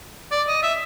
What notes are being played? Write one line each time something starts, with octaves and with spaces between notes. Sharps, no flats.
D5
D#5
E5